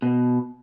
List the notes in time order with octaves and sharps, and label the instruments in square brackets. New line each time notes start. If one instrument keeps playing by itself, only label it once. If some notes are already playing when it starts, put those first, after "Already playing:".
[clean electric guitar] B2